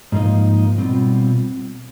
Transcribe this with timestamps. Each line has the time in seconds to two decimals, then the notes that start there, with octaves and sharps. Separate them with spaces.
0.12 G#2 F3 A#3 D#4
0.78 B2 G3 C4 F4